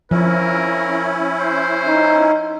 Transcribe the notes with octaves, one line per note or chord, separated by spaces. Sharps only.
F3 C#4 E4 A#4
C5
D#4